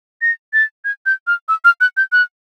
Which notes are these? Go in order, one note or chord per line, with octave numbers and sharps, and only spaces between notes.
A#6
A6
G#6
G6
F6
E6
F6
F#6
G6
F#6